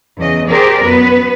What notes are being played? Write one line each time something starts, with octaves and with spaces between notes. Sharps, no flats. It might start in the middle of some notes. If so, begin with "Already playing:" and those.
E2 C#3 D#5
G4 G#4 A#4 C5 D5
F#2 B3 B4